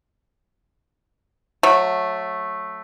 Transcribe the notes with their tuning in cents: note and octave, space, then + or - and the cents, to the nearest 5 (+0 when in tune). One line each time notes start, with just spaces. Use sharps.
F#3 -20 A3 +0